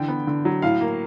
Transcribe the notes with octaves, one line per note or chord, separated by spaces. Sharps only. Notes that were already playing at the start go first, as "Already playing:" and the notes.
Already playing: D3 E3 G5
B3
D3
F#3
A2 F5
A#3